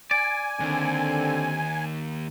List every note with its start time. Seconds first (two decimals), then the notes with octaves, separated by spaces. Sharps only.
0.11 D5 G#5
0.60 D#2 D3 C4